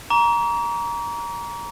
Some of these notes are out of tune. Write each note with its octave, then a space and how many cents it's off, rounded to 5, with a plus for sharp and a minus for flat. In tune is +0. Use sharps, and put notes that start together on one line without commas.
A#5 +15 D6 -45